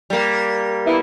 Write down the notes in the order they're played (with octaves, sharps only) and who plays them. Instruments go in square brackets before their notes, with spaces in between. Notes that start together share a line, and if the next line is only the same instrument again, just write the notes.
[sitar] G3 A#3
[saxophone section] E3 B3 E4